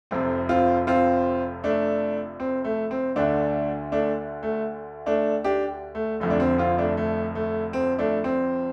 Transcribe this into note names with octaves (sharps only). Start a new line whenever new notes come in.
F1 F2 C3 C4
C4 F4
C4 F4
A3 D4
C4
A3
C4
D2 D3 A3 D4
A3 D4
A3
A3 D4
D4 G4
A3
F1 F2 D3 A3
D4
C4
C4 F4
A3 D4
A3
A3
C4
A3 D4
C4